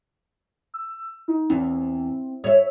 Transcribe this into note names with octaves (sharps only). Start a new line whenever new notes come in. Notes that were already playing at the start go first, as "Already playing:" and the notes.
E6
D#4
E2 C4
C#5 E5